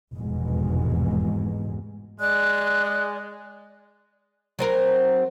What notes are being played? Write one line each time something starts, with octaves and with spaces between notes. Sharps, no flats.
F1 E2 G#2 B2 G#3
G#3 D5 F#6
F#3 C4 A#4